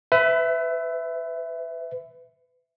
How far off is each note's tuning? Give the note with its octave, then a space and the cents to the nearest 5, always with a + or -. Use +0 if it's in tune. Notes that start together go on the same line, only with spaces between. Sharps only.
B4 +30 E5 +0